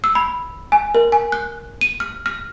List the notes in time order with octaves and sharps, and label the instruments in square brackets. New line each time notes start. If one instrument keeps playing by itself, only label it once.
[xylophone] E6
B5
G#5
A#4
G#5
F#6
D#7
F6
F6